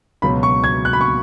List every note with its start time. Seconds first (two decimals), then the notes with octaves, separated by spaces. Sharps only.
0.22 C#2 B2 F#3 B5
0.43 C#6
0.64 G#6
0.85 F#6
0.93 B5
1.01 C#6